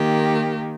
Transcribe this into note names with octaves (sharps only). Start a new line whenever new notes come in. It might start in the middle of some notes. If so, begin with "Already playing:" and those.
Already playing: D#3 A#3 G4